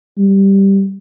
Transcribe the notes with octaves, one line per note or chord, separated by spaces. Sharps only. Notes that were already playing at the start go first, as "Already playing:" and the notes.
G3